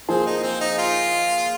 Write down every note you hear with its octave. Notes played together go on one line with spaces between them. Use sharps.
F3 A#3 C4 G#4 C5
D#4
C4
D#4
F4